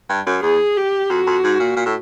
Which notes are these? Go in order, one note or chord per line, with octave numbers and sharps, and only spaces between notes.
G2
F#2
E2 G#4
G4
F2 F#4
F2
G#2
A#2
A#2
A2